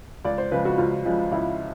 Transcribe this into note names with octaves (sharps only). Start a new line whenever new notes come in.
C#2 D5
C5
C#3 F3 G#3 B4
F#4
C#2 F4
C#3 F3 G#3
C#2 E4